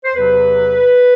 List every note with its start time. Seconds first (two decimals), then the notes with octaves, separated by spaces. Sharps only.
0.04 C5
0.15 E2 C3 F#3 B3 B4